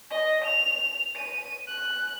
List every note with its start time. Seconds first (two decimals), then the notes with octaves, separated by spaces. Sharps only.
0.11 D#5
0.44 F7
1.16 D#7
1.67 F#6